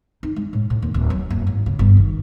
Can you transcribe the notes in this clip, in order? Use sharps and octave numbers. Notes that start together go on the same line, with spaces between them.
D#4
G#3
A2
A2
D#2
D1
F#3
F#1
G#2
C#3
G1
D#3